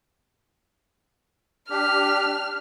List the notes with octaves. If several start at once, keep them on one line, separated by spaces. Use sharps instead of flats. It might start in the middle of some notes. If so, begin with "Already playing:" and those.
D4 G4 F6